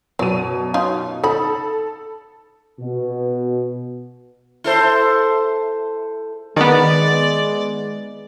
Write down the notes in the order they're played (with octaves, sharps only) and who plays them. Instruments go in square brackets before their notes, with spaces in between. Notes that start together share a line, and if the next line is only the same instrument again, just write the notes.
[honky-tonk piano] F#2 B2 D#7 [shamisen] F#3 D5
[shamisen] C#4 D#4 F4
[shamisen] D#4 B5 [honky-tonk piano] A4
[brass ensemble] B2
[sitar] E4 A4 C5
[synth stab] D#3 B3 [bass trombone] G#3 [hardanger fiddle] D5